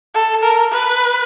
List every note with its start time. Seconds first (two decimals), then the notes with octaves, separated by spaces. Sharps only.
0.15 A4
0.43 A#4
0.72 B4